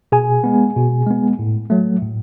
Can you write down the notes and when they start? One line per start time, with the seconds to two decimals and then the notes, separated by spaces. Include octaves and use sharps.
0.12 B2 G#4 G#5
0.44 G#3 B3
0.76 B2
1.07 G#3 B3
1.39 A2
1.70 F#3 A3
2.02 A2